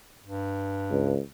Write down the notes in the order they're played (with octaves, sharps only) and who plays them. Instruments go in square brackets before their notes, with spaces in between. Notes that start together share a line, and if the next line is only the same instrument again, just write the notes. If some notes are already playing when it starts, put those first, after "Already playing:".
[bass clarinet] G2
[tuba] C#2